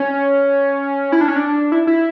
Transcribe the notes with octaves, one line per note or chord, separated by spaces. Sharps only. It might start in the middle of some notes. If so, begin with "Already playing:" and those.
Already playing: C#4
E4
D4
C#4
D4
E4
E4